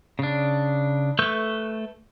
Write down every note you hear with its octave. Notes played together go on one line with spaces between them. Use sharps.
C#3 D4
A3 A4 B4 C#6 G6